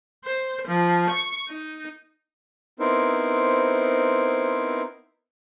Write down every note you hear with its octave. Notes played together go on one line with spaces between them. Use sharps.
C5
F3
C#6
D#4
B3 C4 D#4 E4 A#4 C5